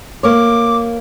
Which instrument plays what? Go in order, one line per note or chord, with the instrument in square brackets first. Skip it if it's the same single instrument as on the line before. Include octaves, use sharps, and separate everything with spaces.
[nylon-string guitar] A#3 C#5 [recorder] D6